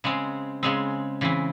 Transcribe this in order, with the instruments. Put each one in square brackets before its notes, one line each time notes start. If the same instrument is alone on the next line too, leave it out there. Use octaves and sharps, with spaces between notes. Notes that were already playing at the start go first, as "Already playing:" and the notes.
[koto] C#3 G#3 C4
C#3 G#3 C4
C#3 E3 C4